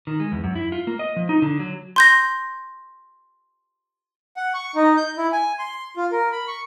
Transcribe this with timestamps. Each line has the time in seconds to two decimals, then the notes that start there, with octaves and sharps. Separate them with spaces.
0.07 D#3
0.20 G#3
0.32 E2
0.44 F#2
0.56 E4
0.72 F4
0.87 A#3
0.99 D#5
1.16 F3
1.29 D#4
1.42 D3
1.60 F#3
1.96 C6 G6 A#6
4.37 F#5
4.54 C#6
4.75 D#4
4.97 G6
5.17 E4
5.32 G#5
5.59 C6
5.97 F4
6.12 A#4
6.32 B5
6.48 C#6